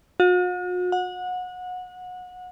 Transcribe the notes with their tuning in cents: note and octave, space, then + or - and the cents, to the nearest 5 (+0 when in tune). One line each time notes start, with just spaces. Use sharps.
F#4 -45
F#5 -25